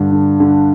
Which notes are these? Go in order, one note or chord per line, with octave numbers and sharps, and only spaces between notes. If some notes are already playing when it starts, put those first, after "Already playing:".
Already playing: G2 D3
D3
D3